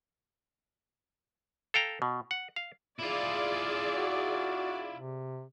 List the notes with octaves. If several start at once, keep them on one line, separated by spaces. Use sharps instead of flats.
A4 F5 G5 A#5
B2
F#5
F5
E4 F4 G#4 D5
F#4
C3